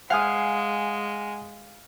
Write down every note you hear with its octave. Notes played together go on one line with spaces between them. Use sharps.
G#3 F5 F#5 G#5 D#6